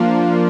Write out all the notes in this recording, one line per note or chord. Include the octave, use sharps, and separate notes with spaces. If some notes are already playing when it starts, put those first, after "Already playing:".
Already playing: F3 A#3 D4 F4